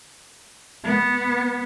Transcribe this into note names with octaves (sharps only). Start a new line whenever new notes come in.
B3